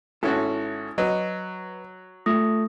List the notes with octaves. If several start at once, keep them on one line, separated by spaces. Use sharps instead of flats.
G#1 C#4 E4 F#4 A4
F#3 B4 D#5
A3 F4 D#6 A#6